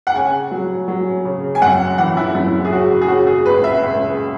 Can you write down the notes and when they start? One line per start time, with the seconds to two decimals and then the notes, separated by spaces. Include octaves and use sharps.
0.07 F#5
0.14 C#3 G#5
0.51 F#3
0.88 F#3
1.25 C#3
1.55 G#5
1.62 F#2 F#5
1.98 E3 F#5
2.17 E4
2.35 F#2 E4
2.65 G#4
2.73 C#3 F#4
3.02 G#4
3.08 C#3 F#4
3.27 G#4
3.46 C#2 B4
3.64 E5
3.83 C#2